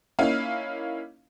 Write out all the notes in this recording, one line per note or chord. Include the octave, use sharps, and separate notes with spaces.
A#3 C#4 D#4 E4 F5